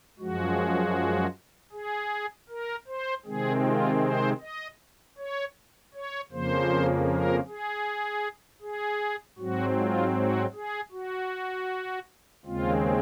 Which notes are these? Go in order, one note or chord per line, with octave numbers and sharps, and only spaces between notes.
F#2 F3 G#3 F#4
G#4
A#4
C5
C3 D#3 G#3 C4 G#4
F4
C5
D#5
C#5
C#5
F2 C#3 F3 A#3 C5
A#4
G#4
G#4
G#2 F#3 C4 F#4
F4
F#4
G#4
F#4
D#2 C#3 G#3 C4 F4